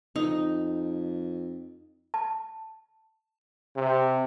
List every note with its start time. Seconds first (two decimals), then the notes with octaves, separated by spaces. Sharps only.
0.16 F2 D#4
2.14 A5
3.76 C3